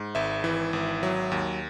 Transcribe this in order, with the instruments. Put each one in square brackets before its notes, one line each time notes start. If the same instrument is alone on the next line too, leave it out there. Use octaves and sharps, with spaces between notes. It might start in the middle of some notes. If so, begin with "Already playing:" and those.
Already playing: [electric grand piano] G#2
G#1 E5
E3
G#1
F#3
D#2